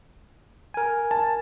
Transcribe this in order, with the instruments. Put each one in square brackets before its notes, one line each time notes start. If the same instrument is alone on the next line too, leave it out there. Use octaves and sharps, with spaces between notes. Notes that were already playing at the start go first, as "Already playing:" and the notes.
[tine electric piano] A#4 G#5
[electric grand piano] A5